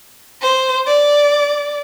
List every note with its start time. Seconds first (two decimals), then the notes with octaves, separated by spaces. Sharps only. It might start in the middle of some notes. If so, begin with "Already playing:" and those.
0.41 C5
0.87 D5